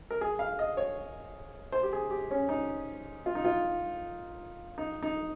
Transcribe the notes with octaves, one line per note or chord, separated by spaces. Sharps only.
A#4
G#4
F5
D#5
C#5
C5
G4
G#4
G4
C#4
D#4
F4
D#4
F4
D#4
D#4